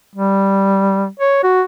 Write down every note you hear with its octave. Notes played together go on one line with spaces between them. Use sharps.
G3
C#5
F#4